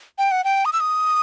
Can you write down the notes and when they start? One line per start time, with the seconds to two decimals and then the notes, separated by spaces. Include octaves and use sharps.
0.18 G5
0.31 F#5
0.44 G5
0.65 D#6
0.73 E6
0.80 D#6